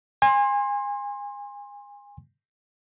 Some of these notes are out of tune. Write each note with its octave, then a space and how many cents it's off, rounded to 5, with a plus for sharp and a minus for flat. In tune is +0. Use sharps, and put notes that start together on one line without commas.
G#5 -30 C6 +20